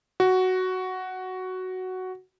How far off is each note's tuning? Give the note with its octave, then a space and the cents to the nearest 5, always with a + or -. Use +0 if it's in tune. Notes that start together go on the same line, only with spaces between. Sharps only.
F#4 +5